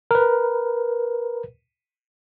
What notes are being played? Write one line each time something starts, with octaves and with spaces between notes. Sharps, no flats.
A#4 B4